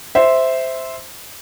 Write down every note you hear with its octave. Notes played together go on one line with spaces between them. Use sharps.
C5 E5